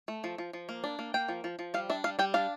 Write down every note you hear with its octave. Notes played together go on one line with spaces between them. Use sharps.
A3
F3
F3
F3
A#3
D4
A#3
A#3 G5
F3
F3
F3
G3 F5
D4 E5
G3 F5
G3 G5
D4 F5